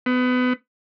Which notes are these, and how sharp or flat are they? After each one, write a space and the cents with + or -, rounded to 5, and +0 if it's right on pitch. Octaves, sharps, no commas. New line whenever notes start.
B3 +30